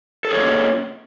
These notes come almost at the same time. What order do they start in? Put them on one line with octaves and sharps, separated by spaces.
A4 G#4 C#5 A#3 C#4